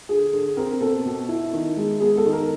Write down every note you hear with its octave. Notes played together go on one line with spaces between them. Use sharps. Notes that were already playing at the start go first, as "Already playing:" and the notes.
D3 G#4
D3
C4 A#4
B2 A4
B2
E4
D#3
G#3
B3 G#4
A4
D#3
A#4